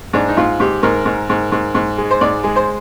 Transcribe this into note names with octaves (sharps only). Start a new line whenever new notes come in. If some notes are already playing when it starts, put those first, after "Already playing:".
G#2 D4
D#4
G#2 F4
G#2 G4
G#2 A#4
G#2
G#2
G#2
G#2
G#3
C5
G#2 D5
G#3
C5